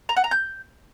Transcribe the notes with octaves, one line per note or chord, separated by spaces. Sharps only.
A#5
F#5
A#5
G6